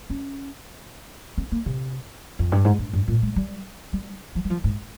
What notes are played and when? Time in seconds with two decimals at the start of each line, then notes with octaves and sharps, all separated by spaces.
0.10 C#4
1.38 C4
1.52 A#3
1.66 C3
2.39 F2
2.52 G2
2.65 G#2
2.79 G2
2.93 G2
3.08 A#2
3.22 G#3
3.36 G3
3.93 G3
4.35 F3
4.45 G3
4.50 F3
4.64 G#2